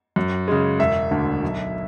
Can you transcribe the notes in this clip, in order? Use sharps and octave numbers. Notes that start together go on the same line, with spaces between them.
F#2
C#3 G#3
E1 E5
D2 D3
B1